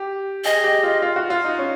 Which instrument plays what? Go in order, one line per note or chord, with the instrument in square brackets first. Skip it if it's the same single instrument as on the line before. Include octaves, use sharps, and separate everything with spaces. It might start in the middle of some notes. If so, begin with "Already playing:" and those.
Already playing: [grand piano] G4
[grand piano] G#4 [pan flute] D#5
[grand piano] G4
F4
F4
F#4
F4
D#4
C#4